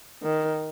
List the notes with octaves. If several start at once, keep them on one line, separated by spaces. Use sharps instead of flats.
D#3